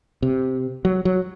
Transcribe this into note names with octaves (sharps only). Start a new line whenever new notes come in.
C3
F#3
F#3